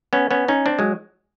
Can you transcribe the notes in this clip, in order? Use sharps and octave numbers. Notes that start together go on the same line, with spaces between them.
B3 C#4
B3 C#4
C#4 D#4
C4 D4
F#3 G#3